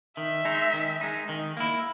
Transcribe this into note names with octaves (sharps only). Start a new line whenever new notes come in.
D#3 E5
G#3 D#4
D#3
G#3 D#4
D#3
A#3 E4